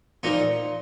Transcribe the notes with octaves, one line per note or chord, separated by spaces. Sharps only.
A#2 F3 D#4